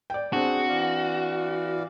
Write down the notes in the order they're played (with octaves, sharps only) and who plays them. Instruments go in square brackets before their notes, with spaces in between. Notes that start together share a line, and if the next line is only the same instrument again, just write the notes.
[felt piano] D5 G5
[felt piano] C4 D4 [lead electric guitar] F#4 [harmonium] G#4
[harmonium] E3 D5 F5